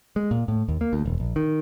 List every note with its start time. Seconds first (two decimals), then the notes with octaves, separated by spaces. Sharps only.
0.16 G#3
0.31 A#2
0.48 A2
0.68 D#2
0.81 A#3
0.93 D2
1.05 E1
1.20 A#1
1.36 D#3